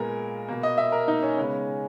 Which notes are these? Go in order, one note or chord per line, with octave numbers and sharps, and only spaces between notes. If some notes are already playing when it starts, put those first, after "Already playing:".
Already playing: A#2 G#3 B3 A#4
B2 A#3
D#5
E5
A#4
D#4
C#4
C#3 G#3 B3